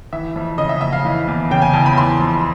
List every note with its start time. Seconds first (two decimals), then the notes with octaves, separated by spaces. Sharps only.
0.13 E3 E5
0.36 F2
0.58 C#3 D#5
0.69 E5
0.81 F2 E5
0.92 F5
1.05 E3
1.28 E2
1.51 C#3 G5
1.62 G#5
1.73 E2 A5
1.86 B5
1.97 E3 C6
2.19 F2